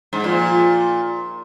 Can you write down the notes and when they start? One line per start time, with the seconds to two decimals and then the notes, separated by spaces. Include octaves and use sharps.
0.13 G#2
0.24 A#2 F3